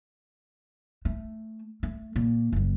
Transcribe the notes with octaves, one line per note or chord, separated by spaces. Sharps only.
A3
A3
A#2
F#1 F#3